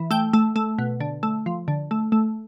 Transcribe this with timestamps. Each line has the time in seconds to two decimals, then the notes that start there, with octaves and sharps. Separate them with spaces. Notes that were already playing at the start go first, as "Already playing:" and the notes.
Already playing: E3
0.11 A3 G5
0.33 A3
0.56 A3
0.78 B2
1.00 D3
1.23 A3
1.46 F3
1.68 D3
1.91 A3
2.12 A3